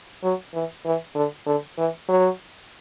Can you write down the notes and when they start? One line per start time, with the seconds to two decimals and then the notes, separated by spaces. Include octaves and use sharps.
0.23 F#3
0.54 E3
0.85 E3
1.15 D3
1.46 D3
1.78 E3
2.08 F#3